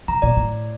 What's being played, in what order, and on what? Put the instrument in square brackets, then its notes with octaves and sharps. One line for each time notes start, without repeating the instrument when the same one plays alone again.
[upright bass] C3 [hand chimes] A#5
[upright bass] A#2 [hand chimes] D5
[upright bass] A2